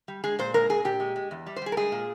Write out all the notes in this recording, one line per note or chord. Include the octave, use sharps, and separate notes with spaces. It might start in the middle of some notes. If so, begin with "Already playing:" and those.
G3
G#3 G#4
A#2 C5
G#3 A#4
A#2 G#4
A#2 G4
G#3
G#3
E2
G3
C5
G3 G#4
A#4
G#3 G#4
A#2